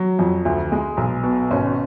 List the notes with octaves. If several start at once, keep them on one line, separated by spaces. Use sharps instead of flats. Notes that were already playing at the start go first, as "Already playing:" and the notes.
Already playing: F#3
F2
D2
G#3
B1
B2
G#1 C#4